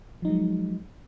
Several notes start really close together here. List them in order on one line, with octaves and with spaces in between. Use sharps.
F3 D#4 F#3 G#3